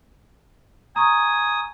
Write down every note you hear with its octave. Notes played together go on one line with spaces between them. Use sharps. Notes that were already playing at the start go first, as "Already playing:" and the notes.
G#5 A#5 C#6 D#6